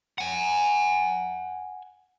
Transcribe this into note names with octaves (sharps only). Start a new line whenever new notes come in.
F#5 G#5